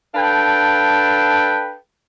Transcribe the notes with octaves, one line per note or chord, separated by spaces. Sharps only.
D4 A4 B4 F5 G5